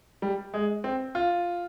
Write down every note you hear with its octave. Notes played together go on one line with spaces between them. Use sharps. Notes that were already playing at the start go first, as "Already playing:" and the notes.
G3
G#3
C4
F4